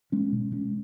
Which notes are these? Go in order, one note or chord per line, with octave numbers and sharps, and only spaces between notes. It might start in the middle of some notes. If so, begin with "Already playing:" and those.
G#3 C#4
B2
G#3 C#4